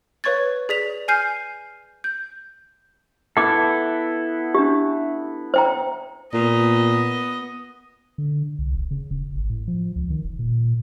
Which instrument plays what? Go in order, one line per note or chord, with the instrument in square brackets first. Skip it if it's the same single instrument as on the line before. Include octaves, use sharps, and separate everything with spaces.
[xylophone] B4 C#5 C#6 G#6 A6
G#4 D5 B6 F7
G#5 F6 G6 C7 D#7
G6
[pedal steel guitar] B3 E4 A4 [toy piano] F#5 D6
[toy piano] D4 G4
C5 G5 A#5
[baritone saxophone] A#2 [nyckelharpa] B3 D#5
[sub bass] D3
C2
E1
C#3
E1
G#1
A2
F3
C#2
D#3
F1
A#2